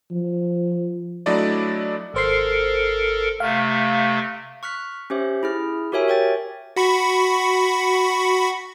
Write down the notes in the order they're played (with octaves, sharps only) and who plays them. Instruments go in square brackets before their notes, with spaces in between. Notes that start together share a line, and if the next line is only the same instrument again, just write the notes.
[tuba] F3
[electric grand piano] F#3 A3 D4 E4 D5 D#5
[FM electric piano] G#1 C5 C7 [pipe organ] A4 A#4
[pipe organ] C3 A3 [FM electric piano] F5
[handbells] C#6 F6 F#6 B6
C#4 G4 C5 E5
E4 G#4 F6
F#4 G4 A#4 C#5 E5 G#5
C#5 G5 A6
[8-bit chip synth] F#4 B5 C#6